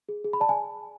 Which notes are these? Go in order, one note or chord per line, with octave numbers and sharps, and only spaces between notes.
G#4
G#4
B5
D5 A5
G#5